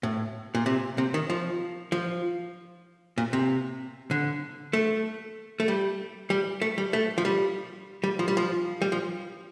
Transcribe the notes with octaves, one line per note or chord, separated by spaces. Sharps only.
A2
A#2
C3
C3
D#3
F3
F3
A#2
C3
D3
A3
A3
G3
G3
A3
G3
A3
F3
G3
G3
F3
G3
F3
G3
F3